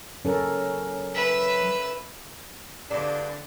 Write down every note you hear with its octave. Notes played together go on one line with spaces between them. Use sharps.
F#3 C#4 A4 A#4
B4 E5
E2 G2 D3 D4 D5